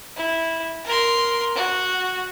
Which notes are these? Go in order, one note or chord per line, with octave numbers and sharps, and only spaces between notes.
E4
A#4 C6
F#4